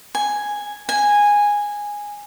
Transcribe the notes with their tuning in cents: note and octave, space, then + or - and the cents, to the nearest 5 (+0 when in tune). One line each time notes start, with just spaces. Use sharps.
G#5 +0
G#5 -10